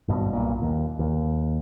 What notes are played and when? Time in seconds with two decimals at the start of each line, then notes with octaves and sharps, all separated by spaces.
0.08 G#1 G2 B2
0.33 B1 A#2
0.62 D#2
0.99 D#2